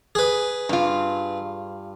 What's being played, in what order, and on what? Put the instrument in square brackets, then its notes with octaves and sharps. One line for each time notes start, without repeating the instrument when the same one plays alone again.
[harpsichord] G#4 B4
[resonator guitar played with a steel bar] G2 F4